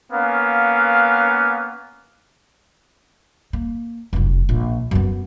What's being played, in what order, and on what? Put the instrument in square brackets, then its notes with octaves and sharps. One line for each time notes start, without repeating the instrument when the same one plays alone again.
[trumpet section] A#3 B3 C#4 F5
[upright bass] A#3
F1 F#2
A#1
F#2 B3